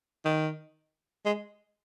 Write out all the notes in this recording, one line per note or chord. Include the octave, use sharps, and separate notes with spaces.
D#3
G#3